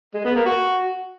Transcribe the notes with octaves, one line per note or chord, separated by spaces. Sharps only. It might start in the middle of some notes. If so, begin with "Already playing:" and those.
G#3
B3
A#3
F#4